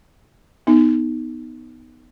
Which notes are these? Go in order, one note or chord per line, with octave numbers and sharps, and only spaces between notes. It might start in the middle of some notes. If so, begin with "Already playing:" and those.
B3 D#4